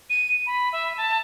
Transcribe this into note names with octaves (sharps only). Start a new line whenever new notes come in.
D#7
B5
E5
A5